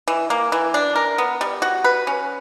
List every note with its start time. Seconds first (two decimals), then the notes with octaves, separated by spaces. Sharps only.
0.08 E3
0.30 A#3
0.52 E3
0.74 D4
0.96 A#4
1.18 B3
1.41 G3
1.62 F#4
1.84 B4
2.07 C#4